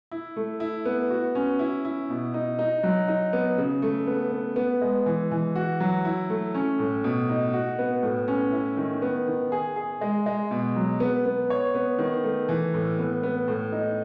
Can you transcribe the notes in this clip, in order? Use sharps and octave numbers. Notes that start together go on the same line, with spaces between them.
E4
A3
E4
B3
F#4
C#4
E4
E4
B2
D#4
D#4
F#3
D#4
B3
C#3
A3
B3
B3
B3
G#3
E3
E3
F#4
F#3
E4
A3
C#4
A2
B2
D#4
F#4
B3
A2
C#4
E4
D#3
B3
D#3
G#4
G#4
G#3
G#3
B2
F#3
B3
B3
C#5
B3
D#3
A3
E3
A2
B3
B3
A2
D#4